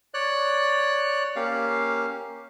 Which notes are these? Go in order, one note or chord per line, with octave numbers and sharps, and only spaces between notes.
C#5 D5 F#6
A#3 C#4 G4 F5